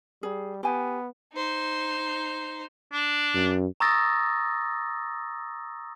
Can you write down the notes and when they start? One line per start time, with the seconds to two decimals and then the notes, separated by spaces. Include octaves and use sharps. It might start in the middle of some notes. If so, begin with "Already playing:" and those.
0.23 G3 G#4
0.63 B3 G4 G#5
1.33 D#4 C5
2.93 D4
3.35 F#2
3.80 A#5 C#6 D#6 E6 A6 A#6